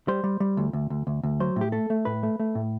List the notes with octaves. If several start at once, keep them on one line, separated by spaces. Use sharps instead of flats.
G3 C5
G3
G3
D2
D2
D2
D2
D2
F#3 C5
A2 G4
A3 A4
A3
A2 B4
A3
A3
A2